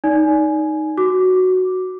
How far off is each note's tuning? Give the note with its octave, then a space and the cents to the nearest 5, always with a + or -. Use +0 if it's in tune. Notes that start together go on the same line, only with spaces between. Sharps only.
D#4 +0 D5 -25 G#5 +15
F#4 +0 D6 +0